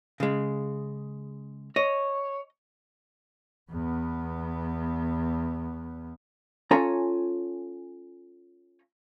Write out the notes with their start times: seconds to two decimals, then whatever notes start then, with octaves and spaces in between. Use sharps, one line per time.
0.20 C#3 G#3
1.76 C#5 D#5
3.71 E2 B3
6.71 C#4 F4 A4 C#5 G#5 A#5